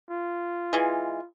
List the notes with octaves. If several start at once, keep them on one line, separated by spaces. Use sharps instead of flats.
F4
E3 G#3